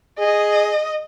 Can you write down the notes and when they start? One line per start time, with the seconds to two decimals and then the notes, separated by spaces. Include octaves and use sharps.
0.19 G#4 D#5